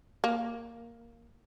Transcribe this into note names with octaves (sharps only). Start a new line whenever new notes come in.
A#3